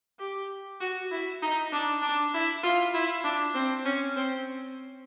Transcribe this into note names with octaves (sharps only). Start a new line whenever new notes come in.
G4
F#4
E4
D#4
D4
D4
E4
F4
E4
D4
C4
C#4
C4